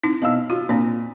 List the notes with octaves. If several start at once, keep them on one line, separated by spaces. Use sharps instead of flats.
C4 D#4 E4
B2 F5 A5 E6
F4 F#4
A#2 C4 D4